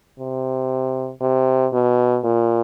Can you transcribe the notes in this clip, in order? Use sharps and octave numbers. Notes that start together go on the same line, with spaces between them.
C3
C3
B2
A#2